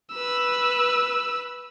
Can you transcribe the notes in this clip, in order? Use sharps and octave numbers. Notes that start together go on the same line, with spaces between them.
B4 E6